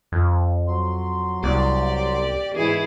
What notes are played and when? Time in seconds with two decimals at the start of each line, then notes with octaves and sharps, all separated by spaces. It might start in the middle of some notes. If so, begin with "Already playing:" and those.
0.12 F2
0.68 F#3 C6
1.43 C2 G4 D5
2.55 G#2 E3 E4 G#4